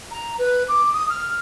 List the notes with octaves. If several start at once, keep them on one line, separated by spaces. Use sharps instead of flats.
A#5
B4
D6
D#6
F6